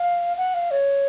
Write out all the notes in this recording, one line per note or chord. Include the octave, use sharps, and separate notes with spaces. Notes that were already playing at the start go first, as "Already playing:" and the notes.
Already playing: F5
F#5
F5
C#5